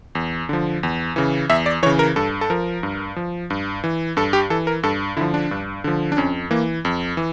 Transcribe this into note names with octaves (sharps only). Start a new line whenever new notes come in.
E2
D3 F3
E2
C#3 E3
E2 E5
D5
C#3 E3 C#5
A#4
G2 A4
A4
F3 A#4
G2
F3
G2
E3
G2 A4
G4
E3 A4
A#4
G2 A4
D3 F3 E4
D4
G2
D3 F3
D4
F2 C#4
E3 A#3
F2
E3